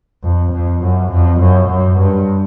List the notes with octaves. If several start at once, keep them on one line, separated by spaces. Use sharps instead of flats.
F2
F2
F#2
F2
F#2
F#2
G2